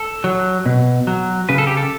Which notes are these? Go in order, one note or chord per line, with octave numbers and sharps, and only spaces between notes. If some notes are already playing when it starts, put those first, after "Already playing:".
Already playing: A4
F#3
B2
F#3
C#3 B4
A4
G4
A4